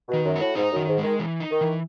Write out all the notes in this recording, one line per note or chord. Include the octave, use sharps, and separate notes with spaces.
B2 D#3
F#2
A2 F#4
G#2 D#4
F#2 D#3
G#2
G#3
D#3
E3
D#4
D#3
E3